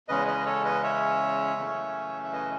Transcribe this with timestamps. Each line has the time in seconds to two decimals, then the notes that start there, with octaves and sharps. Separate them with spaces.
0.08 E2 C#3 G#3 C#4 B4 D#5
0.27 B4 D#5
0.40 B4
0.46 A4 C#5
0.64 B4 D#5
0.83 C#5 E5
1.57 F#2 C#3 E3 A3 C#4
2.24 E5
2.33 B4 D#5